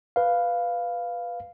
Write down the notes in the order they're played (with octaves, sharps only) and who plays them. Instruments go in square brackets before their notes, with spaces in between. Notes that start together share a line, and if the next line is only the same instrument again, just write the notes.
[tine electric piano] B4 F5